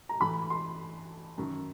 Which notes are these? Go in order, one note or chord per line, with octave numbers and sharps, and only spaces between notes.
A#5
A2 E3 B5
C6
F#2 D#3